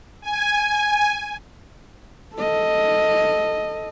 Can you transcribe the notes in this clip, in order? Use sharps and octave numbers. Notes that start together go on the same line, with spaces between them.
G#5
A4 D#5